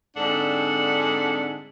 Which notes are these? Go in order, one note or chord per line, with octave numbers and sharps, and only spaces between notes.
G#2 D3 C4 D4 A4 F#5